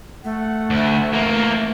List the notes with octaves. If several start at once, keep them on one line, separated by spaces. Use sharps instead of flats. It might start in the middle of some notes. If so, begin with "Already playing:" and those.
A3 F#5
D2
E3 A#3